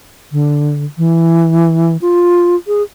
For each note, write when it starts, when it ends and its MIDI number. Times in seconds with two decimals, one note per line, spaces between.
0.32 0.85 50
0.98 1.97 52
2.01 2.56 65
2.67 2.83 68